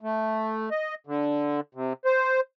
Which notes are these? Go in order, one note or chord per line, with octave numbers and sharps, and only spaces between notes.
A3
D#5
D3
C3
C5